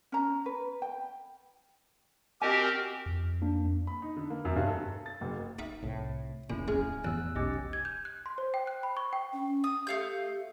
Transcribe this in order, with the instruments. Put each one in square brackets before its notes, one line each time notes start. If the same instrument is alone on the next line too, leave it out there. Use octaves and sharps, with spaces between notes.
[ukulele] C#4 A#5
B4
G5
[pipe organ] C4 G4 A#4 [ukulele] F#4 D#5 G#5
[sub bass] F2
[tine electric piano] A#3 D4
[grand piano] B5
D#4
D3
A#3
F#2
G2
A4
A4
A6
F#1
[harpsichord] D#4 E5 F5
[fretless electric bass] C2 A2
[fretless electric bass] F1 C#3 [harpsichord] A#2 [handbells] C#4 E4
[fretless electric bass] D1 C#4 [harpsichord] G#3 [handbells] G#5 F6
[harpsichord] A1 [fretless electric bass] F2 B3 [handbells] E6 F#6
[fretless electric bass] E1 B1 [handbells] C#4 G4 D#5
[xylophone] G#6
G6
F#6
C6
C5
G5
F#6
B5
C#6
G5
[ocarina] C#4
[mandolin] D#6
[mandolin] A3 F5 G6 [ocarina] G4